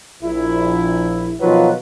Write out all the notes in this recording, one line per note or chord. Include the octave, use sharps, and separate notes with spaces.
A#1 E4
B2 D#3 F3 F#3 F4 B4